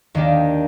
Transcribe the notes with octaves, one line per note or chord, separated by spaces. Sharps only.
D#2 D#3 A#3 D4 G4